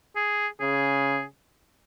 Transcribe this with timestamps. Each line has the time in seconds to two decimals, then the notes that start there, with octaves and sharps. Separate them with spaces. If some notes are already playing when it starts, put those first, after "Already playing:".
0.16 G#4
0.60 C#3 G#4